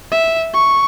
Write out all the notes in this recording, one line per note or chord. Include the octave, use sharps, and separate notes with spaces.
E5
C#6